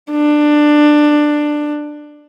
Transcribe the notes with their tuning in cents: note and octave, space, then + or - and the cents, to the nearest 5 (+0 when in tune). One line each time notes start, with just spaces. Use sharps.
D4 +15